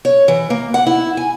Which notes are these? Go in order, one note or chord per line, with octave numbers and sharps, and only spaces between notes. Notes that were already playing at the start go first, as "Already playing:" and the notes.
C#5
E3
A#3
F#5
E4
G#5